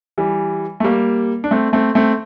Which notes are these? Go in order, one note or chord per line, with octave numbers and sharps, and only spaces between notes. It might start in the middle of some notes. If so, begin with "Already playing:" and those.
E3 G3
A3
G3 A#3
D4
A3 C4
A3 C4
A3 C4